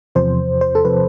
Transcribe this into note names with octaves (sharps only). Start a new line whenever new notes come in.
E2 C3 F3 C5
C5
A4
C3 F3 B4